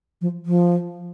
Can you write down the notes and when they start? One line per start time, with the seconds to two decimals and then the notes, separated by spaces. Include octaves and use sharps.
0.21 F3
0.46 F3